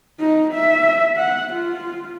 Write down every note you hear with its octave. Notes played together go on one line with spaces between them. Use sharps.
D#4
E5
F#5
F4